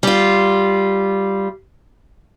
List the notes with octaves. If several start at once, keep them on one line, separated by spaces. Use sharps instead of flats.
G3 F4